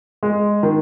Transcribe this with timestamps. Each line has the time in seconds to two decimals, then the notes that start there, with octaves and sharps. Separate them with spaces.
0.23 G#3
0.63 D#3